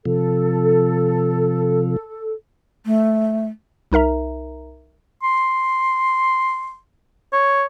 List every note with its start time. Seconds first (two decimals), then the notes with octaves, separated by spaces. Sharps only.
0.05 C3 F3 A4
2.85 A3
3.92 C2 D#4 A#4 E5 A#5
5.23 C6
7.33 C#5